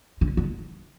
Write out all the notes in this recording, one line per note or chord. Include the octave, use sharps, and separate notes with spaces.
D3
D3